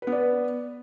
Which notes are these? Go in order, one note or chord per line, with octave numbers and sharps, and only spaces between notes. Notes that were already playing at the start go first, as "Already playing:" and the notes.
B3 B4 D5